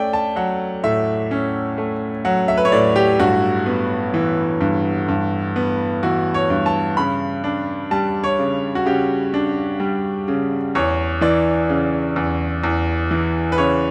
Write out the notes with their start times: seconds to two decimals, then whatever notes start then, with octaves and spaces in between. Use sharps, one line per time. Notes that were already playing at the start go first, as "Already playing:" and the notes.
Already playing: A3 C#4 D5 G5
0.13 A5
0.36 F#3 F#5
0.84 A2 E5
1.31 C#4
1.78 A3
2.25 F#3 F#5
2.48 E5
2.57 B4
2.65 C#5
2.72 A2 D5
2.96 G4
3.19 G2 F#4
3.66 B3
4.14 E3
4.61 G2
5.08 G2
5.56 B3
6.03 E3 F#4
6.34 C#5
6.50 G2
6.66 A5
6.97 C#3 B5
7.44 D4
7.91 G3 A5
8.24 C#5
8.39 C#3
8.75 F#4
8.86 C#3 G4
9.34 D4
9.80 G3
10.28 C#3
10.75 E2 C#5
11.21 E3 D5
11.69 C#3
12.16 E2
12.64 E2
13.11 E3
13.52 B4
13.58 C#3 C#5